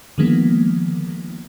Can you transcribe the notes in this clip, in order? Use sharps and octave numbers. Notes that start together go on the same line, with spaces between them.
D3 D#3 F3 G#3 A#3 B3